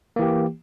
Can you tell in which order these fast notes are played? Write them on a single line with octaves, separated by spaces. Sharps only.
A#3 E3 G4